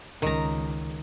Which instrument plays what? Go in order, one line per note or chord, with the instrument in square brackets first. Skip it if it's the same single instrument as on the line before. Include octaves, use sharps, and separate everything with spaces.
[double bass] C#2 [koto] D#3 A#5